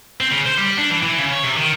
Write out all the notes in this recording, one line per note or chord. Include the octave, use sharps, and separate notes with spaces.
C4
C#3
C5
G3
D4
E3
E3
C#3
C#5
C3
D#3